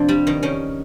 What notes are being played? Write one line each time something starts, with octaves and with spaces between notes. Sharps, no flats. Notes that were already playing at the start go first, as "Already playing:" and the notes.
Already playing: F2 C3 D4
G3
D#3
D#3 C#4